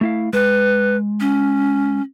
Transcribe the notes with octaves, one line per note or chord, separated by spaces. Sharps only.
A3 E4 F5
G#3 B4
C#4